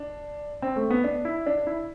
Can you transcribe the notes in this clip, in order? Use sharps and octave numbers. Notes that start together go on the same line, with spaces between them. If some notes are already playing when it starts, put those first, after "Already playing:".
Already playing: D4
C4
A3
B3
D4
E4
D4
E4